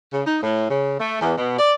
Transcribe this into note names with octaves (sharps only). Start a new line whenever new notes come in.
C#3
D#4
A2
C#3
A3
E2
B2
D5